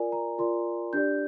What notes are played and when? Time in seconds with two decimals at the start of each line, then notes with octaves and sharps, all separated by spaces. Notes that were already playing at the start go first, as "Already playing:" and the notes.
Already playing: F4 A#4 D5 G#5
0.12 A#5
0.39 F4 A#4 D5 C6
0.93 D4 G4 D5 G6